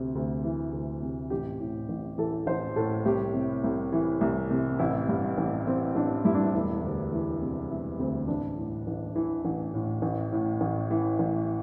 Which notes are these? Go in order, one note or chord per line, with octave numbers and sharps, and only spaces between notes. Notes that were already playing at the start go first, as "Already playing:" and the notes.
Already playing: D2 C3
D2
E3
D2
C3
A1 G4
A2
A1
E3 A4
A1 C5
A2 A4
C2 G4
C3
C2
E3
C2
C3
A1 E4
G2
A1
E3 C4
A1 D4
G2 E4
D4
E4
E1 E4
D2
E3
C3
E1 E4
D2 C4
A1 D4
A2
A1
E3 E4
A1
A2
A1
A2
A1
E3
A1